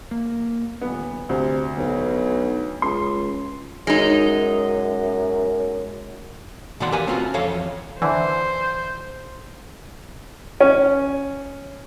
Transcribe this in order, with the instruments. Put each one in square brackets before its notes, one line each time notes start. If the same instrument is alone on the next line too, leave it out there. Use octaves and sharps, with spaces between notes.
[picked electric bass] A#3
[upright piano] D#1 B3
[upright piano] D2 [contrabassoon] C3
[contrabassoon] B1
[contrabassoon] C#2 [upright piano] C6
[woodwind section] F#2 [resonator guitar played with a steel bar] G#3 D#4
[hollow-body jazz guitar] B2 D#3 E3 D5 F#5 C6
G4 A#4 B4 F5 G#5
A3 C4 C#4 F4 F#4
F2 E3 A4 C#5 F5
[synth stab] D3 E3 [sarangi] C5
[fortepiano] C#4